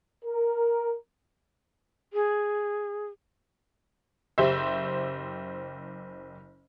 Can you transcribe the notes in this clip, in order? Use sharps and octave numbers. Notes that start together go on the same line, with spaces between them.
A#4
G#4
F#1 G4 C5 E5